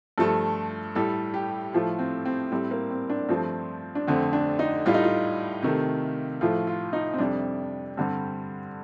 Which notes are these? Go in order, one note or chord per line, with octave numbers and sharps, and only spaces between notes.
G2 F3 A3 A4
A2 G3 A4
G4
A2 F3 A3 F4
C4
C4
A2 G3 C4
A#3
C4
D4
G2 F3 A3 C4
D4
F2 D3 A3 C4
D4
D#4
A2 G3 F4
D#4
F4
C3 D#3 A3
A2 F3 A3 F4
F4
D#4
C4
F2 C3 G3 D4
G2 D3 G3 C4